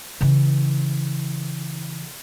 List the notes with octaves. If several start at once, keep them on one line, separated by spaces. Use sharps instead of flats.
C#3 E3